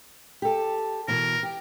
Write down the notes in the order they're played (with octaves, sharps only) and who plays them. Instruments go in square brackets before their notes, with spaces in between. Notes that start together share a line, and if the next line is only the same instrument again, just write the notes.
[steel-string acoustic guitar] G4 A4
[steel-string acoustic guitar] B2 E3 [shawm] A#4
[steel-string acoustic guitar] G4